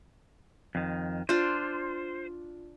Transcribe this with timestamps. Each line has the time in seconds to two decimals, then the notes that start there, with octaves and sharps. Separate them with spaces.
0.75 F2 D#3
1.29 D4 F4 C5